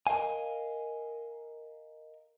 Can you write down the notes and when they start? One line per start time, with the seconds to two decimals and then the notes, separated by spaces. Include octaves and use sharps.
0.07 A#4 D#5 F5 G#5